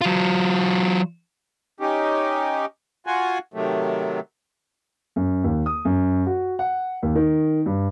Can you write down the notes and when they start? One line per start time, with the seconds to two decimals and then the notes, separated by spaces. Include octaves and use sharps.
0.01 F#3 F4
1.80 C#4 D#4 G4
3.07 F4 F#4 F#5 G#5
3.54 C3 D#3 F#3 A3
5.16 F#2
5.44 D#2
5.66 D#6
5.85 F#2
6.26 F#4
6.59 F#5
7.03 D#2
7.15 D#3
7.66 G2